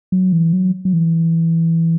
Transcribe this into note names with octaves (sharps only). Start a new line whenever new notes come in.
F#3
E3
F#3
F#3
E3